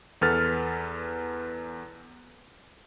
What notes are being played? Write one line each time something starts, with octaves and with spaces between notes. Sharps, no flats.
E2 A4 B4 F6 A6